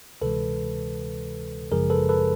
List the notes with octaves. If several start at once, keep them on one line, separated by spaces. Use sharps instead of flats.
D2 C3 E3 G#3 A4 B4
G#1 F#2 C#3 F3 G#3 G#4 A#4
A4 B4
A4 B4